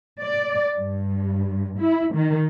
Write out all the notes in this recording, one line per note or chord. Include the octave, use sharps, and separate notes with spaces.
D5
G2
E4
D#3